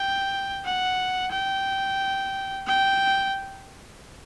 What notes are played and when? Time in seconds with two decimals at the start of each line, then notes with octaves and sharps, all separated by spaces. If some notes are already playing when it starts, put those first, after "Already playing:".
Already playing: G5
0.65 F#5
1.32 G5
2.67 G5